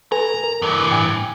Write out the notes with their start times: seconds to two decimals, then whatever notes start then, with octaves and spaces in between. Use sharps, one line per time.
0.12 A4 B4 G#5 A#5
0.44 A#4
0.62 G2 E3
0.90 A2 G5 G#5